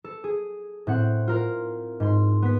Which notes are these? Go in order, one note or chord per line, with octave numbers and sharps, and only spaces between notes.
A4
G#4
A2 C4 F#5
F4 A#4
G#2 C6
B3 B6